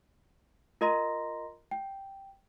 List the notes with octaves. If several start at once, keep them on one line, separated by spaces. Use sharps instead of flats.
F4 A#4 D#5 A#5 C6 A#6
G5